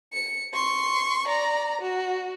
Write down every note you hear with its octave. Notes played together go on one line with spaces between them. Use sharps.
C#7
C6 C#6
D5 A#5
F#4